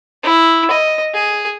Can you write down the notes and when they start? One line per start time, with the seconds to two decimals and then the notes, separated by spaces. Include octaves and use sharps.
0.23 E4
0.71 D#5
1.14 G#4